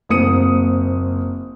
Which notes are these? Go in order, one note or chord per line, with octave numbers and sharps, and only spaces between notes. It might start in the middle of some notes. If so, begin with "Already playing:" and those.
F#1 A#3 C4 D#6 C#7 D#7